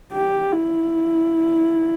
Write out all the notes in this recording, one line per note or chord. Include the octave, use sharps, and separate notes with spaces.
G4
E4